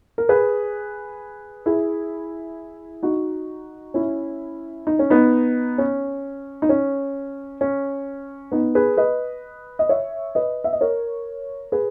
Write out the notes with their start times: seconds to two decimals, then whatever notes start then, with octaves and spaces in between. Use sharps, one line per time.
0.18 A#4
0.29 G#4 B4
1.66 E4 G#4
3.03 D#4 F#4
3.94 C#4 E4
4.87 D#4
4.99 C#4
5.10 B3 D#4
5.78 C#4
6.62 D#4
6.69 C#4
7.61 C#4
8.52 B3 D#4
8.75 G#4 B4
8.97 B4 D#5
9.79 D#5
9.89 C#5 E5
10.35 B4 D#5
10.64 E5
10.73 D#5
10.81 A#4 C#5
11.72 G#4 B4